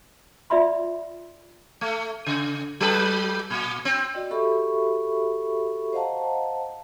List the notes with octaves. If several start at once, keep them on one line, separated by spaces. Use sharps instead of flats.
F4 D5 E5 B5 C6
A3
C#3
F#3 A4 B4
A#2
C4
F#4 D5 D#5 G5
F#4 G4 A4 E5 B5 C#6
C5 D#5 F5 F#5 A5 A#5